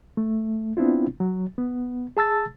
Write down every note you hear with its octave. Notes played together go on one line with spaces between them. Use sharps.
A3
B3 C4 D4 E4 F4
F#3
B3
G#4 A5 E6 A6